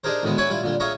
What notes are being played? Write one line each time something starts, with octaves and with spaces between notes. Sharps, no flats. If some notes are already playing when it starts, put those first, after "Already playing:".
D4 D#4 G4 G#4 A#4 C5
D2 A2 D#3 G#3 B3
C#5 E5 F#5 G#5 B5 D6
G3 E4 F4
A#2 D3 G3
F4 G#4 C#5 E5 A#5